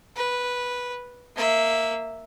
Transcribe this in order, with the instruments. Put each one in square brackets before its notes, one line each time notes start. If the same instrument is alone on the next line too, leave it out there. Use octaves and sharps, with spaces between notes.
[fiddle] B4
A#3 E5